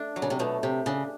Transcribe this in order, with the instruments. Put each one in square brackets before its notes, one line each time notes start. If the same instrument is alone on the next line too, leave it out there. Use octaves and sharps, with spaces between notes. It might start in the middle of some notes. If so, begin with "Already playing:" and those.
Already playing: [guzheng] A3 D4
F#3
[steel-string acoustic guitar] C#3
C3
[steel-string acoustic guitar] B2 [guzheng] A3
[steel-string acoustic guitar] C3 [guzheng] G4
[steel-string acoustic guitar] C#3 [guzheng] D4